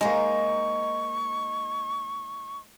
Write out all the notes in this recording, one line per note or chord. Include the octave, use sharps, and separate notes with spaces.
G#3 A#3 D#4 C5 C#6